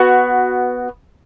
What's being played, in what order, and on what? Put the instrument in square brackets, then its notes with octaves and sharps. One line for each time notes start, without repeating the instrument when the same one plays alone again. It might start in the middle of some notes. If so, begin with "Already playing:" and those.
Already playing: [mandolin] B3 F#4